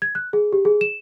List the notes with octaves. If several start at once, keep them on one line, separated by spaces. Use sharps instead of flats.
G#6
F#6
G#4
G4
G#4
E7